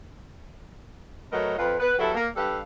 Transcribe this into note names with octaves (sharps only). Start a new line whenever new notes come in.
F#3 A3 A#4 B4 C#5 D#5
F2 F4 B4
B3 B4
F#3 G3 B3 E4 A4
A#3
G3 D4 A4 B4 F5